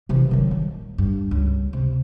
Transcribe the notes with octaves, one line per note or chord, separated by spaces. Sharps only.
C3 E3
D#3 F#3
D#1
G2
C#2
C3